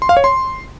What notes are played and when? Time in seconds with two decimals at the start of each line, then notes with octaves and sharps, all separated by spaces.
0.02 C6
0.09 F5
0.17 C#5
0.24 C6